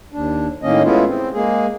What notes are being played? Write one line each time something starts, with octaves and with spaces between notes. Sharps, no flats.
D#2 D4
A2 D#3 A#3 C#4 D#5
G#3 A3 B3 C#4 E4 F4
C4
G#3 A#3 G#4